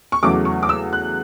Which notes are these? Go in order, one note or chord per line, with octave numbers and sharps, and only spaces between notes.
C#6
E2 C#3 F#3 A3 D6
C#6
D6
E6
F#6